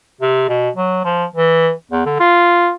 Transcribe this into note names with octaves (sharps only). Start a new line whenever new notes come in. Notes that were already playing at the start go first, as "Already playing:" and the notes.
C3
B2
F#3
F3
E3
E2
D3
F4